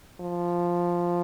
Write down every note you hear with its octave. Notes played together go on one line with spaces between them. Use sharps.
F3